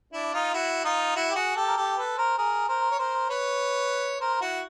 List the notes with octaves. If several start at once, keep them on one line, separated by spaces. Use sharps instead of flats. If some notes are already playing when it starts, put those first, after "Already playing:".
D4 E4
D#4 F4
E4 F#4
D#4 F4
E4 F#4
G4
F#4 G#4
G4 A4
A#4
G4 A4
A4 B4
A#4 C5
G#4 A#4
A#4 C5
C#5
A#4 C5
B4 C#5
A#4 C5
E4 F#4